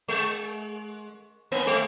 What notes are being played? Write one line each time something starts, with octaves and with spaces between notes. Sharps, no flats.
G#3
A#3
G#3